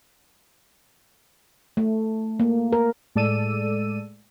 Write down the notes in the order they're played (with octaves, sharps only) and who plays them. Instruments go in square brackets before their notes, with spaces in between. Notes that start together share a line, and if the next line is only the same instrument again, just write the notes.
[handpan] A3
A#3
A#4
[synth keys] A2 G#3 A4 D5 E6 D#7